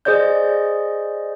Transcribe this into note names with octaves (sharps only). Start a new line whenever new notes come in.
G#4 C5 D5 D#5 G6